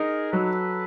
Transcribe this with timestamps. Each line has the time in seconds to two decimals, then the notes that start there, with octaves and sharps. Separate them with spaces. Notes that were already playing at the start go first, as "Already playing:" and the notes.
Already playing: D#4 G#4 A#4
0.32 F#3 A4 B4